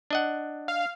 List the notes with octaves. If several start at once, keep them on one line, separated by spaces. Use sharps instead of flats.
D4 D#5 F#5
F5